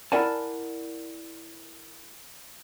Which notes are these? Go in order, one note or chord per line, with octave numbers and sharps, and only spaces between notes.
E4 A#4 D5 F#5 G#5 A5